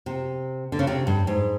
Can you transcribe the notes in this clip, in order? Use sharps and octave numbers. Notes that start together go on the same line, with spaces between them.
C3
D3
C#3
C3
G2
G#2